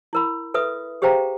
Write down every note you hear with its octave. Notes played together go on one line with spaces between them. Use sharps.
E4 A#4 B5
A4 B4 E5 D#6
G4 G#4 C5 F5 G5 A#5